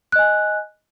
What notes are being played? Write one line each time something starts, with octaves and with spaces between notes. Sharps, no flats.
D#5 G#5 F#6